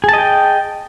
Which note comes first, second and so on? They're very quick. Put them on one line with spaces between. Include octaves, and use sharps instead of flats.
G#4 A5 D#5 G5